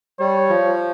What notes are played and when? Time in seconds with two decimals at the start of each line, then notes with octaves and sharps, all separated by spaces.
0.19 G3 C#5
0.49 F3